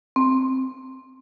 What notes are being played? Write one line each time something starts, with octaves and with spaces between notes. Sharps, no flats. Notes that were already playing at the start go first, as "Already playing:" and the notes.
C4